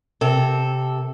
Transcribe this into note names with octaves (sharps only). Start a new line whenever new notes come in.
C3 A4